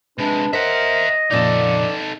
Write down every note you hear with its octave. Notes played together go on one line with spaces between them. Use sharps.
C3 G#3 D4 B4
A#4 C5 D#5 E5 F#5
F2 A#2 C#3 D#4 A4 D5